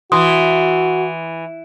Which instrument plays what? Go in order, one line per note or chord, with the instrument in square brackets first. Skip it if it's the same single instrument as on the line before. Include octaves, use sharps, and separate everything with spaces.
[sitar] E3 [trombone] F#4 [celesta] C6 D#6